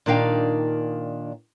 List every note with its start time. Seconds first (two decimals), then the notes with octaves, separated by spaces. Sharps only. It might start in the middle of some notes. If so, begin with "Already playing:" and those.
0.06 A#2 D#3 D4 D#4 F5 G5